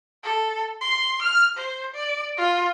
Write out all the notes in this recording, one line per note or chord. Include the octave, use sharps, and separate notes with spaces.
A4
C6
F6
C5
D5
F4